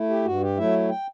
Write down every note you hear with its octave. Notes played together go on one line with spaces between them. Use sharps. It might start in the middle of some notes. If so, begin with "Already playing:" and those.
Already playing: A3 E4
G4
G2 F#4
G4
F#3 A3 E4 E5
G5